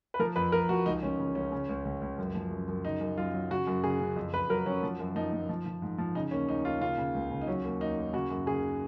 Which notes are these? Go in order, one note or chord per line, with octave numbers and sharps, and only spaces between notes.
B4
F3 A#4
F2 B4
F2 A#4
F3 F#4
C#2 D#4
C#2 C#4
C#3
C#2 C#4
C#3
C#2
C#2
C#2
F#2
F3
F#2
F#2
C#3 D#4
F#2
F#2 F4
F#3
C#3 F#4
F#2
C#3 G#4
C#3
F2
F2 B4
F#3 A#4
F#3 C#4
F3
F#2
F3 D#4
F3
F3
F3
G#2
F3
C#3 D#4
D#2 C#4
D#2 D#4
D#2 F4
C#3 F4
C#3
C#2
C#3
D#4
F#3 C#4
D#2
D#2 D#4
D#2
C#3 F#4
F#2
C#3 G#4